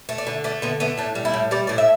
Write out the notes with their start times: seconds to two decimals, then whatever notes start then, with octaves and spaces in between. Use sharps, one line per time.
0.09 A3
0.18 D5
0.27 D3
0.44 A3 D5
0.62 D3 B3
0.80 A3 B3
0.98 A2 D4
1.15 G3
1.25 E4
1.34 A2
1.51 G3 D5
1.67 A2 D5
1.78 E5